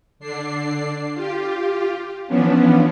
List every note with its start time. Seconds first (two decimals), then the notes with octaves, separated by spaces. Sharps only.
0.19 D3 D4 C7
1.13 F4 G4
2.27 E3 F3 B3 C#4 D4